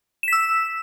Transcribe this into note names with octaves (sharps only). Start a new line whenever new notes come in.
E6 B6 E7